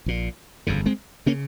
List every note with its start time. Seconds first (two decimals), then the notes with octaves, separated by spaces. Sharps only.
0.06 A#1 A#2
0.67 G1 F2 C#3
0.86 G#3 C4
1.26 C#3 A#3 C#4